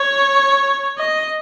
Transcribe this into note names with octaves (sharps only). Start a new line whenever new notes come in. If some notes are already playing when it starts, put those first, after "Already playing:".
Already playing: C#5
D#5